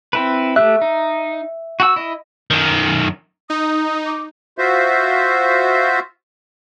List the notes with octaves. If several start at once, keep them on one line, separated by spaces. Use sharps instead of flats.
C4 E4 B4
A3 G4 E5 F#6
D#4
F#4 F#5 E6
E4 D#5
F#2 D#3
D#4 D#6
D6
F4 F#4 C5 E5